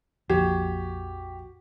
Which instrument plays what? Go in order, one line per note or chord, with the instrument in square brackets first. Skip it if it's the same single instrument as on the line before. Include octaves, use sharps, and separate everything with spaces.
[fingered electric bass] A#1 F2 [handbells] F#4 [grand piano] G4